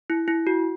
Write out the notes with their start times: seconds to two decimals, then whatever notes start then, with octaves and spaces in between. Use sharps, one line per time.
0.10 E4
0.28 E4
0.47 F#4